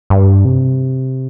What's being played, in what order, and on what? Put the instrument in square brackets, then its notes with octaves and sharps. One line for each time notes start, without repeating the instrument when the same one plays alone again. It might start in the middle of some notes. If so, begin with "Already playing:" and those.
[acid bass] G2
C3